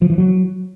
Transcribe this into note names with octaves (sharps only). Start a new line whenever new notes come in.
F3
E3
F#3